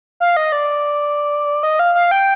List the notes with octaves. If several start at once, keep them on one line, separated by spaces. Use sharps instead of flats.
F5
D#5
D5
D#5
F5
F5
G5